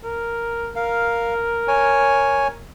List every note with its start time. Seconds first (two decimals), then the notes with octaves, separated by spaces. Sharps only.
0.04 A#4
0.76 A#4 F5
1.68 C#5 G#5